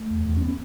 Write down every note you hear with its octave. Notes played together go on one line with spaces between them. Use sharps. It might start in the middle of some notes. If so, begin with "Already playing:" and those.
Already playing: A3
E2
E2
C#4
B3